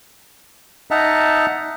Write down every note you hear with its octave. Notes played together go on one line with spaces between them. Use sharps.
D#4 D#5 E5 F#5 A5 A#5